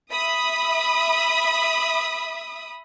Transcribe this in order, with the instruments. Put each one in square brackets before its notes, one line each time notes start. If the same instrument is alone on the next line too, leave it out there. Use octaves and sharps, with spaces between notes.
[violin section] E5 B5 D#6